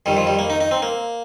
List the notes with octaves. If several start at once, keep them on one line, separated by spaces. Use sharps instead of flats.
F2 D#3 G3
F3
G3
A#3
D#4
D#4
C4
A#3